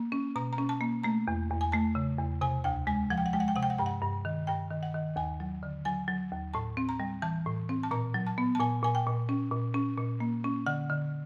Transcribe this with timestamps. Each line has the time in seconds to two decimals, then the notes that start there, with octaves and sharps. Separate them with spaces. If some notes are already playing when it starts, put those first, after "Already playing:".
Already playing: A#3
0.12 C#4
0.36 B2 A#5
0.53 A#5
0.58 C#4
0.69 A5
0.81 A#3
1.03 A3 A#5
1.28 E2
1.50 E2
1.61 G#5
1.72 A3 A5
1.95 C#3
2.19 E2
2.41 C3 G#5
2.64 D2 G5
2.87 G#3 G#5
3.10 F3 F#5
3.18 G5
3.26 F#5
3.33 G#3 G5
3.40 F#5
3.48 G5
3.56 C3 F#5
3.63 G5
3.70 F#5
3.78 G2 G5
3.86 F#5
4.02 G2
4.25 D#3
4.47 G2 G5
4.71 D#3
4.83 F#5
4.94 D#3
5.16 D#2 G#5
5.40 F#3
5.63 D3
5.85 F#3 G#5
6.08 F#3
6.32 D#2
6.54 A2 A5
6.77 C4
6.89 A#5
7.00 G3
7.22 E3 A5
7.46 A2
7.69 C4
7.83 A5
7.91 A#2 A#5
8.14 F#3
8.27 A5
8.38 B3
8.55 A5
8.60 A#2 G#5
8.83 A#2 G#5
8.95 G5
9.07 A#2
9.29 C#4
9.51 A#2
9.74 C#4
9.97 A#2
10.20 A#3
10.44 C#4
10.66 D3 F#5
10.89 D3